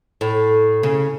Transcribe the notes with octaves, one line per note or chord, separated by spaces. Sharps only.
A2
C#3